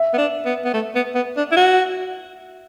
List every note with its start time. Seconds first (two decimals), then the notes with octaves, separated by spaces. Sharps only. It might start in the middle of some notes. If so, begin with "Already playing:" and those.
Already playing: E5
0.14 B3
0.18 D4
0.45 B3
0.65 B3
0.74 A3
0.95 B3
1.15 B3
1.37 D4
1.52 E4
1.57 F#4